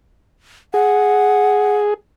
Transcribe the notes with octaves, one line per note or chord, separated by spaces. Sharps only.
G#4 F#5